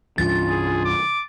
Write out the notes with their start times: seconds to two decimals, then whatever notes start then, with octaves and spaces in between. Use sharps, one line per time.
0.18 C2 G2 E3 C#4 D4 F4 A6
0.49 G#4
0.85 D6